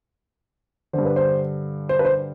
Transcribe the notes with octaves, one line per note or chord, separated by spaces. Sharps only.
D3 C5
G2
B4
C5
C5
B4
C5